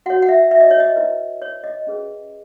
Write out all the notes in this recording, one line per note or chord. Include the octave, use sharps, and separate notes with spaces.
F#4 C#5 F#5
F#5
E5
E5
D#5
C#5
D#5
E4 B4
C#5
D#5
C#4 G#4 B4